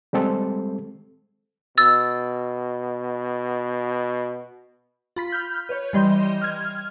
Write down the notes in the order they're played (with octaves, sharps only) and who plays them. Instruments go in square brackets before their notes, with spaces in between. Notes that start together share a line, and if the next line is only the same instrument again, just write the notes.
[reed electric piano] G3 G#3 C4 A4
[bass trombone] B2 [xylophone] E6 A6
[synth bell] F4 B5 B6
F6 G6
B4 C#5
E3 G3 D#5 C6 G6
F6 G#6